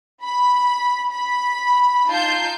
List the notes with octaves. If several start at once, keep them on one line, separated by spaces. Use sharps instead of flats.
B5
B5
D#4 F4 A5 G6 C7